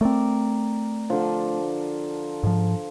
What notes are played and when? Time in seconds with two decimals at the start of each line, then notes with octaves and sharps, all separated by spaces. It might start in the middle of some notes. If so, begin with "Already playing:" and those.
0.01 A3 C4 A#4 D5
1.10 D3 F3
2.43 G#2 F3